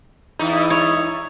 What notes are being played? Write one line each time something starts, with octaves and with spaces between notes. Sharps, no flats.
E2 D#4 E4
C#5